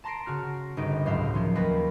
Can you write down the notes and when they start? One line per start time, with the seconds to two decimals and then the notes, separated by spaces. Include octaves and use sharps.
0.04 A5 A#5 C6 A#6 C7 D7
0.26 C#3 F#4 F6
0.77 G1 C#3 D#4 D7
1.06 C#2 A2 F#3 C5 E5 F5
1.34 D#3 F3 C#4 F4
1.55 D#2 B4 B5 A#6